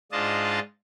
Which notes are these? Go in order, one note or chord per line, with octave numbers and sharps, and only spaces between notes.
G#2 D4 F4 D#5 A5